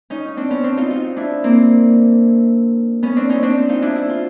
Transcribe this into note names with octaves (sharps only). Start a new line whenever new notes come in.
C#4 D#4
D#4
C4 D4
B3 C#4
C4 D4
D#4 F4
D#4 F4
D4 E4
A#3 C4
B3 C#4
C4 D4
C#4 D#4
C4 D4
D#4 F4
D4 E4
E4
F4